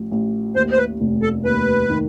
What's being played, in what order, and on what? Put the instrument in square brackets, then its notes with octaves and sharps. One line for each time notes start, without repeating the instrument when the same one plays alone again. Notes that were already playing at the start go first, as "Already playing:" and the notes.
Already playing: [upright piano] A1 F3
A1
[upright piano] D#2 [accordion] C5
[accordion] C5
B4
[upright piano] F1
[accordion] A4
[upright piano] D#2 [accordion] B4
[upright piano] D#3